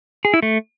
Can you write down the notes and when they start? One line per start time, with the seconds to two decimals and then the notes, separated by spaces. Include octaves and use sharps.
0.25 G#4
0.34 E4
0.43 A3